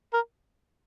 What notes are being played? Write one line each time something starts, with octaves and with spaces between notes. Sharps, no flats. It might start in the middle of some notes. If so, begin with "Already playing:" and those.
A#4